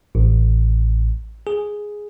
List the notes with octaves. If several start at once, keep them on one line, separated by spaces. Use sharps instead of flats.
A1
G#4